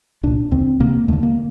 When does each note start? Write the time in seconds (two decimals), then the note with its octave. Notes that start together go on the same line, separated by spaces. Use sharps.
0.23 C2 A#2 D4
0.51 D#2 D3 C4
0.80 D2 C3 A#3
1.08 D#2 D3 A3
1.23 A#3